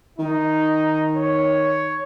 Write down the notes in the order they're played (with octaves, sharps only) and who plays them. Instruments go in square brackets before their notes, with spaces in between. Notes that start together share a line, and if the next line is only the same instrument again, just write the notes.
[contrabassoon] D#3 [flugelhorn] D#4
[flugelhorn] C#5